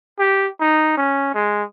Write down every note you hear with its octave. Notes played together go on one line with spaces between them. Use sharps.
G4
D#4
C#4
G#3